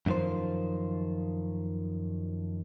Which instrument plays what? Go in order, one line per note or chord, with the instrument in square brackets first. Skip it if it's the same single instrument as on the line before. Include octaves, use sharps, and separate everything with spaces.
[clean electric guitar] F#2 B2 D#3 F3 C5